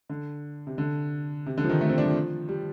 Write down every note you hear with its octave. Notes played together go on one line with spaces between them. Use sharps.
D3
C3
D3
C3
D3
F3
D#3
A3
C4
D4
F3
G3